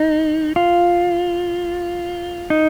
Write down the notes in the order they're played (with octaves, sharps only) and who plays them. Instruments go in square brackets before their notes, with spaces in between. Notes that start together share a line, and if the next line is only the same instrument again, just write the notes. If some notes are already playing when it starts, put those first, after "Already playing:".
Already playing: [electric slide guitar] D#4
F4
D#4